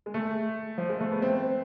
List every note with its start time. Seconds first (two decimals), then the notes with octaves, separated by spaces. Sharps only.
0.06 G#3
0.14 A3
0.78 F3
0.89 G#3
1.00 A3
1.12 B3
1.22 C4